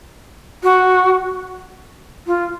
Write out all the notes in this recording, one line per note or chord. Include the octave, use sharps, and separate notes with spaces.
F#4
F4